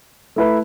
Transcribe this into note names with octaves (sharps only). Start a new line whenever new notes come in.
A3 E4 B4